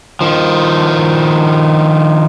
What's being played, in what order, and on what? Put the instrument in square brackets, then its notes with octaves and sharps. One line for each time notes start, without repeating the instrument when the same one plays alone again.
[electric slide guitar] D#3 F3